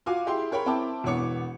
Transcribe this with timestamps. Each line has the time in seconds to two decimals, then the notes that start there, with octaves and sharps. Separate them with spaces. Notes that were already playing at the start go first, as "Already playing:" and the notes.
0.06 F4 F#4 F5 G#5 D6
0.27 E4 G4 G#4 G5 C6
0.51 G#4 A#4 C#5 G5 B5
0.66 C4 E4 A#4 G5 A5 D6
1.04 E1 E3 B3 C#5 D6 C#7